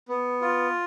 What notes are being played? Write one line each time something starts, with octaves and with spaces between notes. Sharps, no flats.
B3
F4